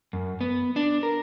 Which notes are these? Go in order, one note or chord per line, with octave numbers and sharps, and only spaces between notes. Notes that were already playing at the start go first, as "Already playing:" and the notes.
F#2
B3
D4
A#4